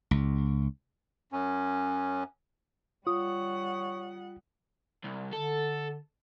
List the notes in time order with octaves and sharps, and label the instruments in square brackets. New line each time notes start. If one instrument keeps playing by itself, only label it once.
[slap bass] C#2
[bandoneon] F#2 C#4
[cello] G3 F#5 [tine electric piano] F4 [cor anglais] C#5 [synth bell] D#6
[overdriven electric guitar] C2
[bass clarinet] D3 [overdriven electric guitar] A4